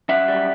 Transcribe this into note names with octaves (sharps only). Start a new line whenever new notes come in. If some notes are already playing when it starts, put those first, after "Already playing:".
F#2 E5 F#5
G3